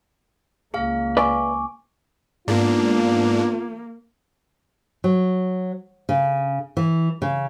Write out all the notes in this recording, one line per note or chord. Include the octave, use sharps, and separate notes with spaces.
C#2 A#3 G#4 F5
B4 D5 E5 G#5 C#6 D6
G#2 A#3 B3 D4 F4
F#3
C#3
E3
C#3